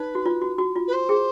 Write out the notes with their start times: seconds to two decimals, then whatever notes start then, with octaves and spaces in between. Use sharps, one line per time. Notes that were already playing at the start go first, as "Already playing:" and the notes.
Already playing: D#4 B4
0.15 F#4
0.26 F4
0.42 F#4
0.58 F#4
0.76 F4
0.87 B4
0.92 C5
1.09 G#4